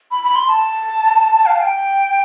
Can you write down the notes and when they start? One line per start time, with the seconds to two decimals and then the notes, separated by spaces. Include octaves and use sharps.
0.11 B5
0.23 B5
0.36 C6
0.48 A5
1.46 F5
1.56 A5
1.61 G5